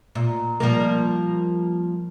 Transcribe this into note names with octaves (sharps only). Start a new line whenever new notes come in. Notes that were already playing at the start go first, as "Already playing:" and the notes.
A#2
F3 G3 A#3